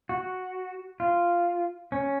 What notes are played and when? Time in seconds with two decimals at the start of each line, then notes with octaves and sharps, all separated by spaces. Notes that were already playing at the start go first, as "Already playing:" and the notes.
0.09 F#4
1.00 F4
1.92 C#4